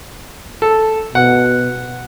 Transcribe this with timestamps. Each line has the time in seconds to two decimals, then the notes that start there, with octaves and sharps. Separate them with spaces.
0.62 A4
1.15 B2 F#5